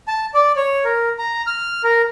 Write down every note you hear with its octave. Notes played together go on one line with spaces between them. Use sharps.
A5
D5
C#5
A#4
A#5
F6
A#4